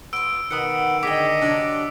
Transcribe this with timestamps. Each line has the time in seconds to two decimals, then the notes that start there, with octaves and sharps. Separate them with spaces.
0.13 B3 F4 E6 D7
0.51 B2 D#3 B3 F#5 D#6 C#7
1.03 D3 G#4 D#5 G5 D6 B6
1.41 C3 D#3 F#3 D4